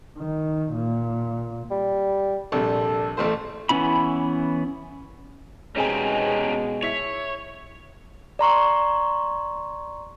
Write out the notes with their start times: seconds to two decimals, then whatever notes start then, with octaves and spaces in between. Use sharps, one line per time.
0.18 D#3
0.74 A#2
1.70 G3
2.52 A#1 C3 G3 A4
3.17 A1 F2 A3 C5
3.69 E3 B3 C#4 E4 B5
5.76 B2 G#3 C4 C#4 D#4 G4 G#4 G#5
6.83 E4 C#5 B6
8.39 D5 A#5 C6 C#6